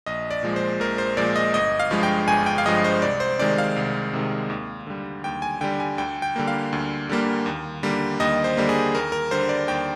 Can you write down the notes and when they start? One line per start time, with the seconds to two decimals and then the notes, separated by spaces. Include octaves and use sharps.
0.06 A#1 D#5
0.31 D5
0.43 A#2 F3 G#3
0.56 C5
0.80 A#1 A#4
0.98 C5
1.17 A#2 F3 G#3 D5
1.36 D#5
1.54 G1 D#5
1.79 F5
1.91 G2 F3 G#3
2.03 G5
2.28 G1 G#5
2.46 G5
2.58 F5
2.65 G2 F3 G#3 D#5
2.84 C5
3.02 C2 D5
3.20 C5
3.39 C3 D#3 G#3 D5
3.58 F5
3.76 C2
4.13 C3 D#3 G#3
4.50 D#2
4.87 D3 G3
5.24 D#2 G5
5.42 G#5
5.61 D3 G3 G5
5.80 G#5
5.98 D2 G5
6.22 G5
6.36 D3 G3 A#3
6.47 F5
6.73 D2
7.09 D3 G3 A#3
7.46 D#2
7.83 D3 G3 A#3
8.20 D#2 D#5
8.44 C5
8.57 D3 G3 A#3
8.69 G#4
8.95 D#2 A#4
9.12 A#4
9.31 D3 G3 C5
9.49 D5
9.68 D#2 G5